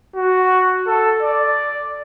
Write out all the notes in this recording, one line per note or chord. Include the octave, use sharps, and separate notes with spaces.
F#4
A4
D5